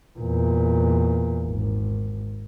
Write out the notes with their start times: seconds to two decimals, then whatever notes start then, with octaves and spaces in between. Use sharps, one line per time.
0.19 E2 A#2
1.45 G#1